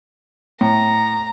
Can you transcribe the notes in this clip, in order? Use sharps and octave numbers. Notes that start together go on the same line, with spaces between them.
A2 A#5